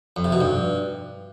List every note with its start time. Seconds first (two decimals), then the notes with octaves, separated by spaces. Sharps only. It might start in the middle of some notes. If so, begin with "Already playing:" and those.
0.16 F2
0.24 C3
0.32 B2
0.41 G2